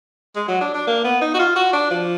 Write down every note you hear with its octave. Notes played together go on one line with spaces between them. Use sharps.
G#3
F#3
D4
D4
A#3
B3
D#4
F#4
F4
F#4
D4
F3